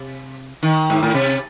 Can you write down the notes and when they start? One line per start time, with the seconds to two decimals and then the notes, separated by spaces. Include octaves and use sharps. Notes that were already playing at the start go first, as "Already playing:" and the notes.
Already playing: C3
0.63 D#3
0.90 G#2
1.03 A2
1.14 C3